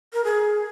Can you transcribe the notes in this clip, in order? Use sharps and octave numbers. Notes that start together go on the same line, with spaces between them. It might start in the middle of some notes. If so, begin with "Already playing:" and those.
A#4
G#4